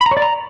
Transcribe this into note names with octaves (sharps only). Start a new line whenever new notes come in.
B5
A#5
C#5
D5
A#5